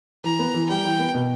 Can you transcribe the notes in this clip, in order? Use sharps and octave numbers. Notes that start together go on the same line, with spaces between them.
E3 A#5
B3
E3
G3 G5
E3
B3
B2